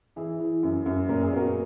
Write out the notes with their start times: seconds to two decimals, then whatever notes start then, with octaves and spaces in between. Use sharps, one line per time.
0.16 E3 E4 G#4
0.40 E3
0.63 F#2
0.86 F#2
1.09 A#2 A#4
1.23 G#4
1.33 B3 F#4 A#4